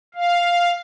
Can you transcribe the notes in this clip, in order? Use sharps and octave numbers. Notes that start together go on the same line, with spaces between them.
F5